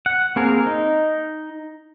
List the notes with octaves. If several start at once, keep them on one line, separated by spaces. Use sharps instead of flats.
F#5
A#3 C4 G#4 A#4
D#4